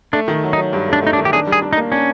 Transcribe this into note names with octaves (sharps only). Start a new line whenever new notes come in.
A3 D4
D#3
F#3
D#4
F#3
G2
A3 D4
A3 D#4
D4
D#3
G4
D4 G#4
G3
G#4
D4
D#4
A#3
C#4 D4